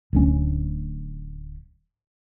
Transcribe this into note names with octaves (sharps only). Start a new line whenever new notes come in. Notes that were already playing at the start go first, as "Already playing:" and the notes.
D1 D2 C#4